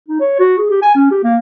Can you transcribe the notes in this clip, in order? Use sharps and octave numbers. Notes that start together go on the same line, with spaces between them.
D#4
C#5
F#4
G#4
G4
G#5
C#4
G4
A#3